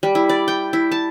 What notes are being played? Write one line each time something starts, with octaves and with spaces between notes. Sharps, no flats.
G3
E4
D5
G5
E4
A5